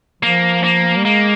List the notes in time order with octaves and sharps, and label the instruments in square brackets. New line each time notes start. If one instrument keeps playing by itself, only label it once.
[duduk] F3 [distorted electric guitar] A#3
[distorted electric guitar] A#3
[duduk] G3
[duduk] G#3 [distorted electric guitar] A#3